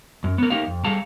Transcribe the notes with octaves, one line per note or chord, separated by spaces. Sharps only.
F#2
B3 A#4
A3 A#3 D#4 G4 A#4 F5
F2
G3 G#4 A4 F5 A5 A#5